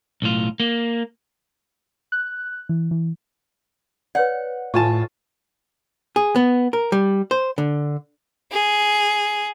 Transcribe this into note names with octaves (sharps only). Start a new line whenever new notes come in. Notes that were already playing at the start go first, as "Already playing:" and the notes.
B1 A2 F4
A#3
F#6
E3
E3
B4 C#5 D5 F#5
A2 F4 G#5 A5 C#6
G#4
B3
A#4
G3
C5
D3
G#4